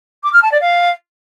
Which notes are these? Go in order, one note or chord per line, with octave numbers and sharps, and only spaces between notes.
D6
F6
A5
D5
F5